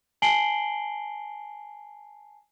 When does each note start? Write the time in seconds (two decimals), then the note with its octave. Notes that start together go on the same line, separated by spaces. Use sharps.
0.22 G#5 A5 C7 D7 F#7 G7